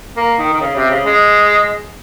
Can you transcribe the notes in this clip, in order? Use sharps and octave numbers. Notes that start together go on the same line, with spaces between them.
A#3
D#3
D#3
C#3
C3
C#3
G#3